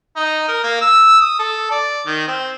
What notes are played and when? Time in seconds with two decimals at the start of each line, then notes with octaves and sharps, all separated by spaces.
0.16 D#4
0.48 A#4
0.64 A#3
0.81 E6
1.21 D#6
1.39 A4
1.71 D5
2.06 D#3
2.27 C4